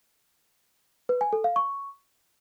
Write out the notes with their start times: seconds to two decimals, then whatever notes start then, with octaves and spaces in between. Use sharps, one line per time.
1.09 B4
1.21 G#5
1.33 A4
1.44 F5
1.56 C#6